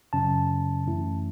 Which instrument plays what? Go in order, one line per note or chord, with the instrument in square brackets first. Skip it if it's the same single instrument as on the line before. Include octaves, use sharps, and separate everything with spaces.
[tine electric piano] F#2 C#3 F#3 C#4 A5
F#2 E3 A3 C#4 E4